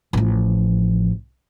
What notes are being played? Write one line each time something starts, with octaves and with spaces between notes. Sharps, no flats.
A1 F3